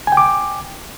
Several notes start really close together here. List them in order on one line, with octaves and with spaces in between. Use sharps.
G#5 G5 D6